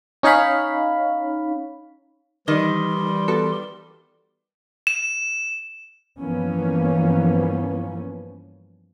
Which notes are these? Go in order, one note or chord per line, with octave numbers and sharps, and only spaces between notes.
C#4 D#4 C#5 F5 B5
D#3 E3 G3 G4 D#5 C6
B3 F#4 A4
E7
G2 E3 F3 A#3 B3 C#4